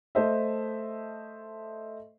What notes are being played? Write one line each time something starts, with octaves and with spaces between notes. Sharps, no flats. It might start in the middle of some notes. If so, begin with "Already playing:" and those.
A3 A4 C5 D#5 E5